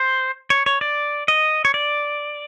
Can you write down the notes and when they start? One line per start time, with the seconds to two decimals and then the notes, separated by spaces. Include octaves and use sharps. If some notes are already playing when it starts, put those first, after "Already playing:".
Already playing: C5
0.50 C#5
0.66 C#5
0.81 D5
1.28 D#5
1.65 C#5
1.74 D5